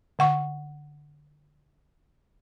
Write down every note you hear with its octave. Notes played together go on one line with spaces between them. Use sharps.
D3 F#5 C#6